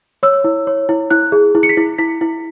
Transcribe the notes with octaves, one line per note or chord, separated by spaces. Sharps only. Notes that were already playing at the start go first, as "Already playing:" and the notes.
C#5 E6
E4
C#5
E4
E4 F#6
G#4
E4
C#7
B6
E4
E4 B6
E4